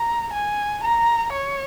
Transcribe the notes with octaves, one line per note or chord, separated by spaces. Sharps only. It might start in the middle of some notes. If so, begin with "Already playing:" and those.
Already playing: A#5
G#5
A#5
C#5